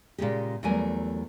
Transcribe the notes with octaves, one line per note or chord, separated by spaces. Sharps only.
A#2 C#3 G#3 G4
E2 F#3 G3 A3 A#4 G#5